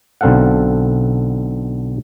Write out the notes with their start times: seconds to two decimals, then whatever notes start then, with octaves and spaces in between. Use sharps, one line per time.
0.21 B1 D3 C4 A4 F5 F#5